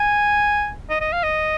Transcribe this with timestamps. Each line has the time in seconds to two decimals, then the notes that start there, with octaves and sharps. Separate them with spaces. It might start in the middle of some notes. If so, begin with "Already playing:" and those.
Already playing: G#5
0.90 D#5
1.01 D#5
1.13 F5
1.23 D#5